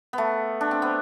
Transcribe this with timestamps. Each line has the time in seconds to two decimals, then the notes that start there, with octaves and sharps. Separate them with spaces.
0.13 A3 B3
0.61 D4
0.71 C4
0.82 B3